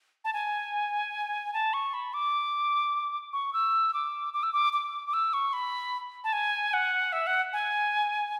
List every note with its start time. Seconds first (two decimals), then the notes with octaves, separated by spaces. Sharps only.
0.24 A5
0.33 G#5
1.53 A5
1.73 C#6
1.94 B5
2.13 D6
3.33 C#6
3.53 E6
3.94 D6
4.34 D6
4.43 E6
4.53 D6
4.73 D6
5.07 D6
5.13 E6
5.33 C#6
5.53 B5
6.24 A5
6.33 G#5
6.73 F#5
7.12 E5
7.27 F#5
7.53 G#5